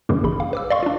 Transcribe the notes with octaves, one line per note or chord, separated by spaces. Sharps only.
F#2 C#3 E3 G3 A#3 D4
A1 G#4 B5
F5
B4 D6 E6
D5 D#5 F5 C6 C#6
D4 F4